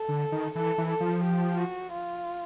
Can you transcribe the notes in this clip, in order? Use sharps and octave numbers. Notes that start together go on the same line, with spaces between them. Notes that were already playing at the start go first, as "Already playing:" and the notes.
Already playing: A4
D3
D#3
E3 A4
E3
A4
F3
G4
F#4
F4